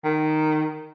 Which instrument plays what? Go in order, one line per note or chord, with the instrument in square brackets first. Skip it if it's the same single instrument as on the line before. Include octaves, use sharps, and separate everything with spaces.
[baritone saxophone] D#3